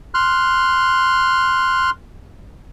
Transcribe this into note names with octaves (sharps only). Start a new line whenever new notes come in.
C6 F6 F#6